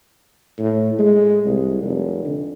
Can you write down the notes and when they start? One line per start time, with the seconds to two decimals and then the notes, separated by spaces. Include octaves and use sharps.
0.59 A2
0.99 G#3
1.46 C2
1.83 F1
2.25 D3